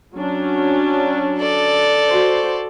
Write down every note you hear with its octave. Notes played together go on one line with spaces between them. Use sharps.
F#3 C#4 D4
A4 D5
F#4 C5